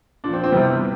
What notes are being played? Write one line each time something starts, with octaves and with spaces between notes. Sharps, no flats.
A#2 F3 D4
C4
C4
C3 E3 G3 B3